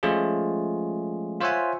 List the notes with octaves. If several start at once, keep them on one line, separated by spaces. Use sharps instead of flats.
F3 G#3 A3 C#4 F4 G#4
F4 C5 C#5 E5 F#5 G#5